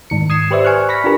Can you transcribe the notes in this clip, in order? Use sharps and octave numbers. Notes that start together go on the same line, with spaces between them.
G#2 D#3 C#7
D#6 G#6 C7 E7
G4 B4 C5 D5 E5
G#5 C#6 F6 F#6
B5 C#6 A#6 B6
D4 F4 G4 A#4 B4